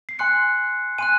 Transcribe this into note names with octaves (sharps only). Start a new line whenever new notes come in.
C7
G#5 C6 F#6 C#7
G#5 C6 F#6 D#7